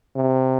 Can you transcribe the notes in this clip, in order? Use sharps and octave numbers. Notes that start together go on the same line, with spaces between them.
C3